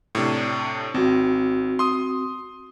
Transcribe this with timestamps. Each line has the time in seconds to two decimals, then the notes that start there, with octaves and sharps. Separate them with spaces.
0.15 A2 C3 D4
0.94 G#1 C4 F#4
1.79 C6 D#6